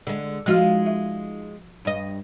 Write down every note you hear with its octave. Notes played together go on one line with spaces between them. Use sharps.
D3 G#3
F3 G#3 D#4 F4 F#4 F6
E5
G2 D#5